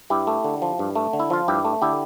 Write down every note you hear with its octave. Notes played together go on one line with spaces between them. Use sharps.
G2 E4 G4
A3
D3
F3
G2
A3
D3
E4
F3 F4
G2 E4 G4
A3
D3 E4 G4